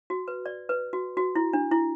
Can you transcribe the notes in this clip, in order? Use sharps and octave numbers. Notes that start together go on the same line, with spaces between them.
F#4
B4
D5
B4
F#4
F#4
E4
D4
E4